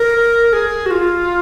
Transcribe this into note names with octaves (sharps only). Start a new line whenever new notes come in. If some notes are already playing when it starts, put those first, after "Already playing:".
Already playing: A#4
G#4
F#4
F4